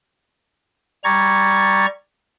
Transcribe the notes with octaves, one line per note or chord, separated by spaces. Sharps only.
G3 A#5 C#6 G#6 A6